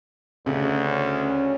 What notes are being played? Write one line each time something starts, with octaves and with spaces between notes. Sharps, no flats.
D2 C#3
C#4